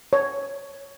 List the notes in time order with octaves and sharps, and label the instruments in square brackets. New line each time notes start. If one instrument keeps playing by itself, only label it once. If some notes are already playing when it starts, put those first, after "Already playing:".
[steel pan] C#5